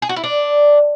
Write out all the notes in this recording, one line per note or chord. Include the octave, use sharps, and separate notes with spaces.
G#4
F#4
E4
D4